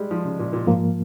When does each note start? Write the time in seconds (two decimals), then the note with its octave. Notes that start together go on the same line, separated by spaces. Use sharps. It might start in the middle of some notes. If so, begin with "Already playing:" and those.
Already playing: G3 G#3
0.11 F3
0.25 C#3
0.39 A#2
0.53 A#2
0.67 G#2 F3 A#3